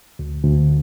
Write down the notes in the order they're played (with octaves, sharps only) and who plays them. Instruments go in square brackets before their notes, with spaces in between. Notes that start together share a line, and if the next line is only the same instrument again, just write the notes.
[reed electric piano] D2
D2